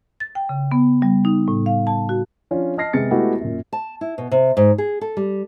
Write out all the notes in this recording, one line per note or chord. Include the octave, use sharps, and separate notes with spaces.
A6
G5
C#3
B3
G3
D#4
A2
F5
A5
F#4
F3 C#4 D4 F4
D#5 A5 F6 A#6 C7
C3 G#3 B3 G#4 A6 C#7
G#3 A3 B3 E4 F#4 G4
F#2 A#2
A5
E4
B2
C3
G#2
G#4
A4
G3